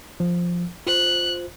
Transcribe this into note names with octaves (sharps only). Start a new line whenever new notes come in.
F3
F4 C5 F#6